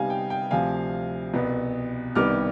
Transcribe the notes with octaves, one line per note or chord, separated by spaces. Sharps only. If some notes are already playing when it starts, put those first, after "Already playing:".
Already playing: C3 G3 B3 D#4 F5 G#5
G5
G5
D2 C3 F3 F5 G#5
C2 B2 B3
C2 C3 D#3 G3 B3 D6 F6